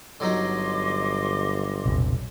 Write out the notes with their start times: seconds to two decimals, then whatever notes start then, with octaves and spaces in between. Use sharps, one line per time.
0.20 G1 D3 F#3 D#4 D#5 C6 D6
1.86 E1 A#1 C3